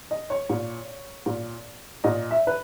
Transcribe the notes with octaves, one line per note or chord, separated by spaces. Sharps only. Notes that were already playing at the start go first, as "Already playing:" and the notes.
D#5
C#5
A#2
A#2
A#2 D#5
E5
B4